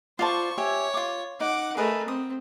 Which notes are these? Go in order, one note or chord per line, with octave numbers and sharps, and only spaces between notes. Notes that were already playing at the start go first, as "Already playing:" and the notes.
F4 C5 D5 A5 C#6
G4 C#5 E5 G#5
F4 D6
D#4 F#5 D6
A3 G#4 A#4 B4 D#5
C4 D#6